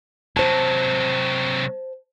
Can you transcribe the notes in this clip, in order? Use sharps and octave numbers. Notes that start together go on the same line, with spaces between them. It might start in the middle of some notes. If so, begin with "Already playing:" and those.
C3 F#3 C5 A5